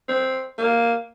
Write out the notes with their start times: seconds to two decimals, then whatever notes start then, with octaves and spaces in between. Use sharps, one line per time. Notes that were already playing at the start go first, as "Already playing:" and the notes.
0.08 C4
0.58 A#3